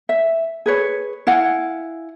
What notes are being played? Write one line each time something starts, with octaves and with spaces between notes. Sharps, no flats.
E5
G#4 B4 C#5
E4 F5 F#5 G#5